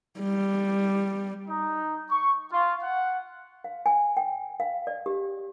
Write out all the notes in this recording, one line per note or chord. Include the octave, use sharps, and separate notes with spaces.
G3
D#4
C#6
F4
F#5
F5
G#5
G5
F5
D5
G4